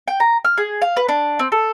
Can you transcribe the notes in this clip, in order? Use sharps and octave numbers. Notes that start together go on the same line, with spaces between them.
G5
A#5
F6
G#4
F5
B4
D4
C4
A4